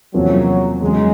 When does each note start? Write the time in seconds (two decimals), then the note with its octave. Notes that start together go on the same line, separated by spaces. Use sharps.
0.14 E2 C3 F3 F#3 A#3 C#4
0.81 E2 C#3 F#3 G#3